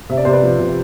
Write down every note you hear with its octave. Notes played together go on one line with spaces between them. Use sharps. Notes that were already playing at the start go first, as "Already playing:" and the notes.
C3 E5
D5
C3 C5
B4 D5
F3
C3